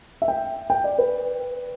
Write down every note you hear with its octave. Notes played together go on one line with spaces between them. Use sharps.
E5
G5
G5
D5
B4